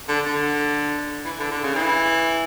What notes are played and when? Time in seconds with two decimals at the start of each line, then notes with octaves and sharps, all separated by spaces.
0.08 D3
0.26 D3
1.25 E3
1.39 D3
1.51 D3
1.63 C#3
1.76 E3